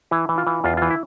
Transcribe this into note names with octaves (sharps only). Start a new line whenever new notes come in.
E3 E4
E3
F4
E3
E2 F4
E3 F4
E4